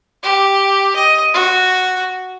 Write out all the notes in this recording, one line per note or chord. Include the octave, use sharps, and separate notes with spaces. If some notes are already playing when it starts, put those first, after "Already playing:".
G4
D#5
F#4